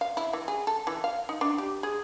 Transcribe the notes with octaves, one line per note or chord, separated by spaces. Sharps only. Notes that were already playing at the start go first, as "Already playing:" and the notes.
F5
E4
E3
G#4
A4
E3
F5
D#4
D4
G4
G#4